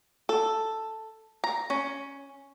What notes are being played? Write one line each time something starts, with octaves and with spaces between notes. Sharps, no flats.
A4
A#5
C#4